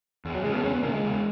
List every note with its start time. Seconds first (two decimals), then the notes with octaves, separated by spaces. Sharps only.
0.25 E2
0.35 F#3
0.44 C#3 G#3
0.54 B3
0.64 E2 C#4
0.73 B3
0.83 C#3 A#3
0.94 G#3
1.04 E2